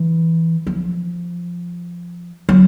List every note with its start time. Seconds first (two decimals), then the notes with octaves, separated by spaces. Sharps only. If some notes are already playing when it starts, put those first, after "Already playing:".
Already playing: E3
0.67 F3
2.49 F#3